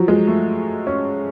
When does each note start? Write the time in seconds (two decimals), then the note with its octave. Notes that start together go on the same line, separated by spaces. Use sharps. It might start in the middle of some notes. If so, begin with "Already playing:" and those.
Already playing: F3 F#3
0.08 G#3
0.27 A3
0.87 C#4